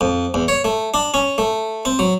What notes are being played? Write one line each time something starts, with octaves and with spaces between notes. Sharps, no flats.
F2
E2
C#5
A3
D4
C#4
A3
C4
F#3